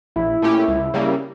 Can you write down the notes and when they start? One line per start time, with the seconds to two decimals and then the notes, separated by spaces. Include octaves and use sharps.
0.16 A#1 E4
0.42 A#2 A3 C#4 G4
0.68 C#2
0.94 C#3 G3 A#3